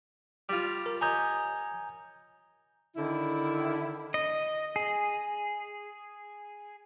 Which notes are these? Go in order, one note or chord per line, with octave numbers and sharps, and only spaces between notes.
G3 F4
A#4
C#5 D#5 G#5 A#5 G6
D3 D#3 E4
D#5
G#4